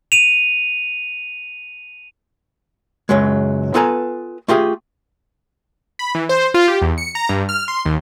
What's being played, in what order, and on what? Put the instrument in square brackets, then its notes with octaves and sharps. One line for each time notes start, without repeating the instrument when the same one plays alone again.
[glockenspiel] D#7 F7
[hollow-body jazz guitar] C#2 F#2 F#3 G#3
B3 F4 A4 B4 G#5 A#5
A3 F4 G4 G#4
[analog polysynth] B5
E3
C5
F4
G4
E2
C#7
A#5
G2
F6
C6
D#2